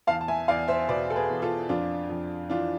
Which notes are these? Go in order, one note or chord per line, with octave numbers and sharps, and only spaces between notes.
E2 F5 A5
A5
E5 G#5
E2 D5 F5
C5 E5
B2 B4 D5
A4
G#4 B4
E2
F4 A4
F2 D4 F4
F2
E3 D4 F4